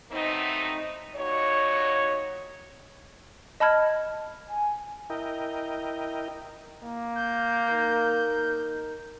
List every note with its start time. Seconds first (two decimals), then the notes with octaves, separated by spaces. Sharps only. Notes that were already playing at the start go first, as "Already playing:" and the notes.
0.12 F#3 A3 B3 C4 D#4
1.15 A#2 D#4 F#4 C#5
3.60 D#5 A5 B5 F6 G#6
4.49 G#5
5.10 E4 A#4 D#5 G5
6.83 A#3
7.15 G6
7.70 D#4 A#4